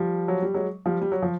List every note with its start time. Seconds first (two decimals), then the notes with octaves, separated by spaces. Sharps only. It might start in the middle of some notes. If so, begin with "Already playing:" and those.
Already playing: F3 G3
0.28 F#3
0.42 G3
0.54 F#3 G#3
0.86 F3 G3
1.01 G3
1.12 F#3
1.22 F3